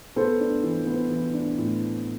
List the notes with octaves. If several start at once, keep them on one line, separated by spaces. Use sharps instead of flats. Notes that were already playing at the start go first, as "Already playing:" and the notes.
B3 A4 C5
D4
E3
B3
E3
D4
A2